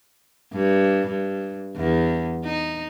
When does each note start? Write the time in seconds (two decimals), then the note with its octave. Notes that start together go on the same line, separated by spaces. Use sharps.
0.52 G2
1.07 G2
1.76 E2
2.44 D#4